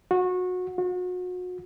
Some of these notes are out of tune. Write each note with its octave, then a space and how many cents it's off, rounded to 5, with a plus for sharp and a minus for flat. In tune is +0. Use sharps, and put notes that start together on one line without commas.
F#4 -25
F#4 -35